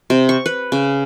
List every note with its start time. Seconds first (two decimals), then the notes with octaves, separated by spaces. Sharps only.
0.10 C3
0.29 C#6
0.46 B4
0.72 C#3